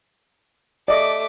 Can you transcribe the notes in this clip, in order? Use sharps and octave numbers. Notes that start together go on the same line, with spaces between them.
A3 D5 D#5 D6